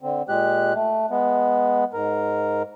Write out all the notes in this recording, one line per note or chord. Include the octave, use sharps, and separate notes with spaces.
D3 C4
A#2 G#3 G4 F#6
A3
G#3 B3
G#2 A#4